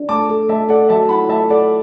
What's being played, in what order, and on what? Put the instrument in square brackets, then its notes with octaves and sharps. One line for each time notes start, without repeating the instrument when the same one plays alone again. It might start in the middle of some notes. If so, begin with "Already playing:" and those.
Already playing: [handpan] D4
[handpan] A3 [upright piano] A5 D6
[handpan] A4
[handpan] A3 [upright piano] E5 A5
[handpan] A4 [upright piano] D5 F#5
[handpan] F#3 [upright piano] E5 A5
[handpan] E4 [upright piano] F#5 B5
[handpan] A3 [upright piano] E5 A5
[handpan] A4 [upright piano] D5 F#5